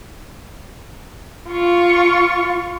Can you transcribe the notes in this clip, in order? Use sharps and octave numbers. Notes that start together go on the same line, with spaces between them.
F4 C#6